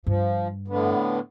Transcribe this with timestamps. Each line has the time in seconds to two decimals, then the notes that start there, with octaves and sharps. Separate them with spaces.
0.06 G2 F3
0.68 A2 D3 B3